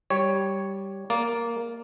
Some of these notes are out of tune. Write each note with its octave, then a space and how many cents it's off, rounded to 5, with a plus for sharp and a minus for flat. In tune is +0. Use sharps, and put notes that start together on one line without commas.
G3 -5 C#5 +0
A#3 +0 D5 -15